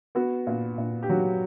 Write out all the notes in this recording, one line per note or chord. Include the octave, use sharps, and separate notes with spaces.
B3 F#4
A#2
A#2
G4
F#3 F#4